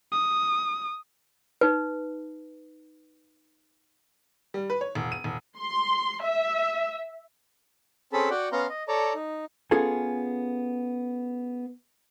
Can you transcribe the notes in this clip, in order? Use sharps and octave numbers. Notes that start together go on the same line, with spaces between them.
D#6
D#4 B4
G3
B4
C#5
E1
D#7
E1
C6
E5
C4 C#4 G#4 A4 A5 B5
F#4 D5 F#5 G5
B3 C#4 F5 A#5 C6
D#5
A4 C#5 D5 A5 A#5
D#4
B3 C#4 F4 G#4 A4 G#5